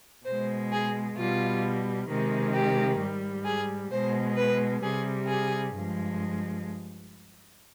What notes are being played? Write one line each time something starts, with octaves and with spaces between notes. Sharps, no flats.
B2 G#3 C5
G#4
B2 G3 F4
C3 D#3 G#3
G4
G#2 G3
G#4
B2 G#3 C5
B4
C3 G3 G#4
G#4
G2 F3 G#3